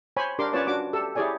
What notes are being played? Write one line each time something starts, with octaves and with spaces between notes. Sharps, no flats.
C5 C#5 G#5 B5
D4 G4 A#4 C6 D6
C#4 F4 B4 C#5 D5 A5
D4 F#4 D6
G4 A4 E6
E4 G4 G#4 C#5 D5 G#5